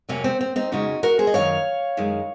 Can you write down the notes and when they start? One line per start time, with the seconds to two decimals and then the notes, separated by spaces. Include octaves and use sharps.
0.09 F2 C3 F#3 A#3 C#4
0.24 C4
0.41 C4
0.56 C4 D#4
0.72 F2 C#3 G#3 D#4 F#4
1.03 F#4 A#4
1.19 G#4 C5
1.27 D#5
1.34 F#2 D#3 F#3 C#5 F5
1.97 F#2 D#3 G#3